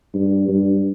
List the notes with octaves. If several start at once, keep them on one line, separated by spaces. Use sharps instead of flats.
G2
G2